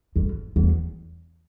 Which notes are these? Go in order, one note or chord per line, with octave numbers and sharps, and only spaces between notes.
F2
E2